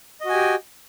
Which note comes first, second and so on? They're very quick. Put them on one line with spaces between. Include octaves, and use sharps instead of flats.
D#5 F#4 G#5 G4